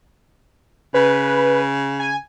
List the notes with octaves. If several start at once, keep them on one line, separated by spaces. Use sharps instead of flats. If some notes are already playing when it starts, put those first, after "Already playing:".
C#3 B4
G#5